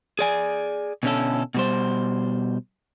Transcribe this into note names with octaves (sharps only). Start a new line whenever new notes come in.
G#4 D5 G#5
B2 D3 A3 C#4 E4 A4
B2 G3 C5